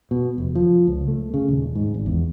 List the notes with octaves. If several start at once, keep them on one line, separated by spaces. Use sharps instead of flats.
B2
F1
F3
C#2
A3
C#3
D#1
G#2
G#1
E2